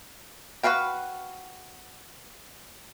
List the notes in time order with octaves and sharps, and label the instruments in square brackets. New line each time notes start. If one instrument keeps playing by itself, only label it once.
[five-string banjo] F#4 A4 B4 F5 G5